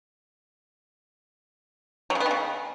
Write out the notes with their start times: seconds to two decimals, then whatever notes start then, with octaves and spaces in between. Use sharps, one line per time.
2.10 F#3
2.15 C#3
2.20 B3
2.26 D#3
2.31 C#3